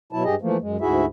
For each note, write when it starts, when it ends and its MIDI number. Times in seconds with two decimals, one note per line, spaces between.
0.13 0.24 47
0.13 0.24 54
0.13 0.24 64
0.13 0.24 81
0.24 0.35 43
0.24 0.35 67
0.24 0.35 68
0.24 0.35 75
0.42 0.57 52
0.42 0.57 53
0.42 0.57 57
0.42 0.57 58
0.61 0.77 42
0.61 0.77 56
0.81 1.05 38
0.81 1.05 44
0.81 1.05 64
0.81 1.05 66
0.81 1.05 68
0.81 1.05 76